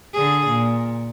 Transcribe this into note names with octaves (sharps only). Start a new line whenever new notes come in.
D3 G#4
A#2